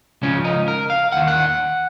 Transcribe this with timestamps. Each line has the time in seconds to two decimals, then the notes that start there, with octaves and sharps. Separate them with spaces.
0.22 C#2 C#3 F3 C#4
0.44 D#4
0.68 A#4
0.90 F5
1.12 D#2 D#3 F#5
1.28 F#5